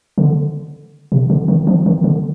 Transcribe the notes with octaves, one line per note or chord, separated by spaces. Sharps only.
D3
C3
D3
D#3
F3
D#3
D3